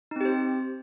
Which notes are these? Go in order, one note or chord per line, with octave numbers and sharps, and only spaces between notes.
C4 D#4 G4 C5